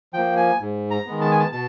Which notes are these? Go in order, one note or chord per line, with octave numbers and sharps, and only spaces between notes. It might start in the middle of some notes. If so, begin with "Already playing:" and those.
F3 A#3 G5
G#5
G#2
A#5
D#3 G#3 B3
A5
G#5
A5
B2 A5